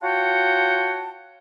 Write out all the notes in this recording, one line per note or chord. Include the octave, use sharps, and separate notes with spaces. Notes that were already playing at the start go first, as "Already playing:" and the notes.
F4 F#4 C#5 F#5 G5 A5